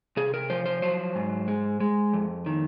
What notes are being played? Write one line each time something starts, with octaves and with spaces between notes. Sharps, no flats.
C3 G#4
A#4
F3 C5
C5
F#3 C5
G#2
G#3
G#3
F2
D#3